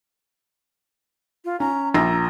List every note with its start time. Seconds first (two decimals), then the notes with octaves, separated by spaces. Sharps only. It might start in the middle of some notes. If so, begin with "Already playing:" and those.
1.45 F4
1.60 C#4 A#5
1.94 A#1 A#5 E6 A#6